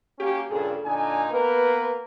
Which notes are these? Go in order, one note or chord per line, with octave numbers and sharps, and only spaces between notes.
A#3 C#4 F#4 G4
G2 A#2 C#3 G#4 A4
A#2 D3 D#4 G#5
A#3 B3 A#4 B4